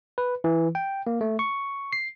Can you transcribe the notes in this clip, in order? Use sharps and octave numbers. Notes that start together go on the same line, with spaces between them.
B4
E3
G5
A#3
A3
C#6
C7